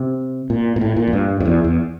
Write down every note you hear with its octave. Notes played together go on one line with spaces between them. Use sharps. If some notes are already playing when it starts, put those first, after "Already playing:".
Already playing: C3
A#2
A#2
A2
A#2
F2
G2
F2
E2
E2